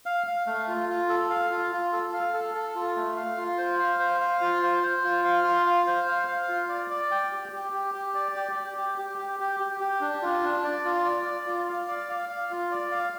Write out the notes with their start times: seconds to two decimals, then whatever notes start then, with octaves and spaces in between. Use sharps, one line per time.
0.06 F5
0.27 F5
0.47 A3
0.68 F4
0.89 F4
1.09 A4
1.30 F5
1.51 F4
1.72 F4
1.93 A4
2.13 F5
2.34 A4
2.54 A4
2.75 F4
2.96 A3
3.17 F5
3.38 F4
3.58 C5
3.79 F5
3.99 C5
4.20 F5
4.41 F4
4.63 C5
4.83 C5
5.04 F4
5.25 F5
5.44 F4
5.66 F5
5.87 C5
6.08 F5
6.27 F5
6.49 F4
6.69 D5
6.90 D5
7.11 G5
7.32 G4
7.52 G4
7.73 G4
7.94 G4
8.15 D5
8.36 G4
8.56 G4
8.78 G4
8.98 G4
9.18 G4
9.39 G4
9.60 G4
9.80 G4
10.01 D4
10.22 F4
10.43 D4
10.64 D5
10.85 F4
11.05 D5
11.26 D5
11.46 F4
11.68 F5
11.88 D5
12.09 F5
12.29 F5
12.51 F4
12.71 D5
12.91 F5